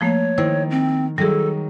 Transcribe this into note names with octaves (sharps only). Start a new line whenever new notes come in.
F3 A3 A#3 C#5
D#3 E4 C5
C4
D#3 F#3 G3 G#4 A4